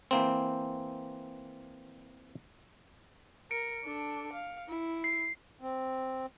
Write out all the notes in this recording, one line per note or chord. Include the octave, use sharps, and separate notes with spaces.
E3 A#3 C4
A#4 C#7 D7
D4 A4
F5
E4
C7
C4